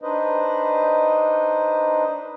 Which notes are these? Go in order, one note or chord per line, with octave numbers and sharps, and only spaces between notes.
D4 D#4 B4 C5 D#5